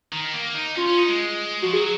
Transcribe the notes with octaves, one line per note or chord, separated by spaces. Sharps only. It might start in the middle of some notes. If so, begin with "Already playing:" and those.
D#3
A#3
D#4
C#4 F4
C#4
D#4
G#3
F3 F#4
F#3 G#4